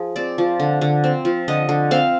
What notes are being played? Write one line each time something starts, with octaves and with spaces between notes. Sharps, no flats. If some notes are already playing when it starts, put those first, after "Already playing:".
Already playing: F3 G#4
C4 D5
F3
D3
D3
C4
F3
D3 D#5
D3
C4 F5